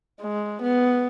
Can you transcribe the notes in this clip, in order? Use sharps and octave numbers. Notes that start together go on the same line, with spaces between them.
G#3
B3